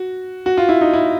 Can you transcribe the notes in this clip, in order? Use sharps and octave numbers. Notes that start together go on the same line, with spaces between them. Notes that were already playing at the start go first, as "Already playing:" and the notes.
Already playing: F#4
F#4
F4
E4
D#4
E4